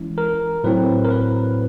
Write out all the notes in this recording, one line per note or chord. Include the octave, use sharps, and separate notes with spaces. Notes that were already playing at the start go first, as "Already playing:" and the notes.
Already playing: E3 G#3 C#4 E4
A#4
A2 F#3 A3 C4 E4 B4
A#4
B4